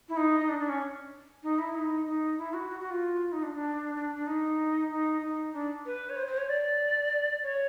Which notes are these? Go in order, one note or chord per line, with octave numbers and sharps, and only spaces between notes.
E4
D#4
D#4
D4
D4
C#4
D#4
E4
D#4
D#4
E4
F#4
F#4
F#4
F4
D#4
D4
D4
D4
D4
D#4
D#4
D#4
D4
B4
C#5
C5
C5
C#5
D5
C#5